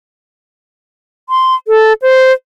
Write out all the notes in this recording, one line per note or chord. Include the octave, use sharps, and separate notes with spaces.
C6
A4
C5